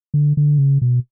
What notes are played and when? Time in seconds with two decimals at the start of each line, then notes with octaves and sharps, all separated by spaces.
0.14 D3
0.37 D3
0.58 C#3
0.82 B2